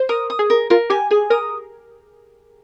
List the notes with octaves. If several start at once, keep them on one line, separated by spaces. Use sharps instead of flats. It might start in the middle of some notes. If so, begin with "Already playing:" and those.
Already playing: C5
A#4 D#6
D#6
G#4
A#4
F4 A#4
G4 G#5
G#4 G#5
A#4 D#6